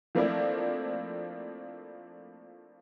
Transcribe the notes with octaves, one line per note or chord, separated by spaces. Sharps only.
F3 A3 A#3 C4 D4 E4